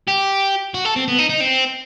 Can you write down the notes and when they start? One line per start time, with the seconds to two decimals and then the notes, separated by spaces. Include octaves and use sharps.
0.08 G4
0.74 F#4
0.85 A4
0.96 C4
1.08 B3
1.19 D#4
1.30 D#4
1.40 C4